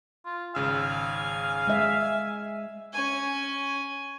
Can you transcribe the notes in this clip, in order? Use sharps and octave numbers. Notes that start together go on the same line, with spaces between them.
F4
G#1 C#3 F5 G#5 E6
G#3 E5
C#4 G#5